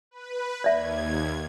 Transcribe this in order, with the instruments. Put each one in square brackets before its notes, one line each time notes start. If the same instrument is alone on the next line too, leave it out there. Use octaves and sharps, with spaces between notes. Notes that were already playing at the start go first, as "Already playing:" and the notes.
[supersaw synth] B4
[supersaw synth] D#2 G#6 [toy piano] D5 E5